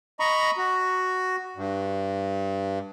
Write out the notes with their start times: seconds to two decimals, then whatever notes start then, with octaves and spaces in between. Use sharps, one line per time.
0.20 D#5 A#5 B5 C#6
0.57 F#4
1.56 G2